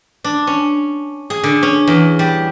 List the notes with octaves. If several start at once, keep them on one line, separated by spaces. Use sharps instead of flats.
D4
C#4
G#4
D3
C#4
E2
G3